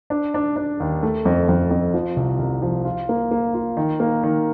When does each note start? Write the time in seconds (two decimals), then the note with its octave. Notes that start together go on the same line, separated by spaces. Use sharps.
0.10 D4
0.34 D4
0.56 D4
0.80 D#2
1.03 A3
1.25 F2
1.49 F2
1.71 F2
1.94 F3
2.17 C2
2.39 C2
2.62 F3
2.85 F4
3.09 A#3
3.31 A#3
3.54 F4
3.77 D#3
4.00 A#3
4.23 D#3